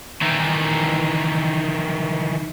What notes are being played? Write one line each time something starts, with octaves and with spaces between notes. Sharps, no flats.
D#3 E3